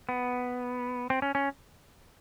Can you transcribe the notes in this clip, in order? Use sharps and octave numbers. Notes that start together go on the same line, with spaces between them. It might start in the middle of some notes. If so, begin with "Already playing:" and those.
B3
C4
C#4
C#4